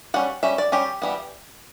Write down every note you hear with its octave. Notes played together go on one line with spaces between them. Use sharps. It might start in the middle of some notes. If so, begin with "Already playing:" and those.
G3 C#4 F#5
G3 C#4 E5
D5
G3 C#4 G4
E3 G3 B3